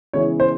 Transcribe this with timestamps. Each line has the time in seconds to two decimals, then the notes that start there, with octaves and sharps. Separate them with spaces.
0.13 C#3 E3 G#3 B3 E4 C#5
0.40 C5